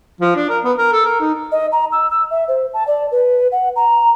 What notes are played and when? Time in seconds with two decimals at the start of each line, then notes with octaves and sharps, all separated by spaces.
0.21 F3
0.36 D4
0.49 A#4
0.64 B3
0.78 A#4
0.92 A4
1.05 A#4
1.20 D#4
1.52 D#5
1.72 A#5
1.92 E6
2.11 E6
2.30 E5
2.48 C5
2.73 A5
2.87 D5
3.11 B4
3.52 F#5
3.76 A#5